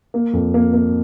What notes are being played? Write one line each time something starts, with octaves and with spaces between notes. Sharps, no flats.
A#3
F2
A#3
A#3